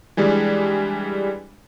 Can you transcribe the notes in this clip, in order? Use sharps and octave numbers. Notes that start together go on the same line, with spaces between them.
E3 G3 G#3 D4